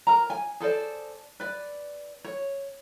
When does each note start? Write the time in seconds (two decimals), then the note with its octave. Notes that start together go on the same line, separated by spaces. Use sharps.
0.07 A#4 A#5
0.30 G#5
0.60 G#4 A4 C5 D5
1.40 B4 D5
2.24 C#5